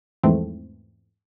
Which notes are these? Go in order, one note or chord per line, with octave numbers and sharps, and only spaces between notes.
E2 G#2 E3 F3 A3 C4